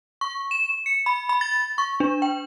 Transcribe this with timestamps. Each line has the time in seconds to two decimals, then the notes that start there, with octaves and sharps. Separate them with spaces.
0.21 C#6
0.51 E7
0.86 C#7
1.06 B5
1.29 B5
1.41 A6
1.78 C#6
2.00 D4
2.22 G5